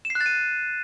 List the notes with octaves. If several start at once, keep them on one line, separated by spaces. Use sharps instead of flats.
E7
C7
F#6
A6
D#7